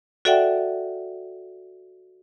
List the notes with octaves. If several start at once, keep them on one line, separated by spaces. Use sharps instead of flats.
F#4 A4 D5 E5 F#5 G5